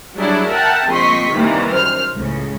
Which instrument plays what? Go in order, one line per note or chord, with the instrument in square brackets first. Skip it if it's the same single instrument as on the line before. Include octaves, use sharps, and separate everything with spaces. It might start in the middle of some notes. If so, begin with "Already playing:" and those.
[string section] F#3 G3 D4 E4 G#4
A#4 E5 F#5 G5 A5
A#1 C4 D#5 C6 C#6 B6
C3 D#3 E3 G3 A#3
F#2 C5 F6
C#2 A2 C#3